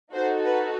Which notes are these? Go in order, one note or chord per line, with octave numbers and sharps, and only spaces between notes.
D#4 F#4 A4 C5
B4